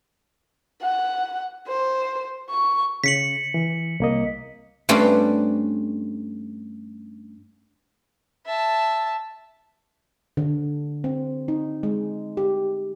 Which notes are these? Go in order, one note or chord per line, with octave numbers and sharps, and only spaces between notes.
F#5
C5
C#6
C#3 B6 C#7 F#7
E3
C2 A#3 D#5
G2 A3 C4 C#4 B4 D5
E5 A5
D3
C4
D#4
G#3
G4